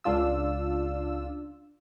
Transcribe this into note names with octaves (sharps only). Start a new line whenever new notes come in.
C#2 D4 F4 E6